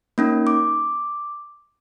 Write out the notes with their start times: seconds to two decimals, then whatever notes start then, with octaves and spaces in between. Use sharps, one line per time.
0.18 A#3 C#4 D#4
0.47 D6